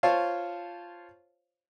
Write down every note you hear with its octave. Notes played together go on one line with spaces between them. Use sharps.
F4 C5 C#5 F5 A5